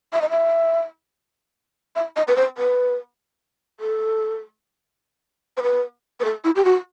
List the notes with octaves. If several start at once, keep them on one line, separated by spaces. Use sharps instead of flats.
E5
D#5
E5
E5
D#5
B4
C5
B4
A4
C5
B4
B4
A4
E4
G4
F#4